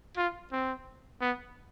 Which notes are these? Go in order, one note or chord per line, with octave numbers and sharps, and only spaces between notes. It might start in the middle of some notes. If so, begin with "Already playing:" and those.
F4
C4
B3